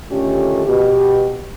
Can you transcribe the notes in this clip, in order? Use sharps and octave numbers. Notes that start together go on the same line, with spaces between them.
D3 D#3 A3 C#4 F4 G4
B2 G4